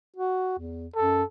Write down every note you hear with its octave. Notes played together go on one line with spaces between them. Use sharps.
F#4
E2
F#2 A4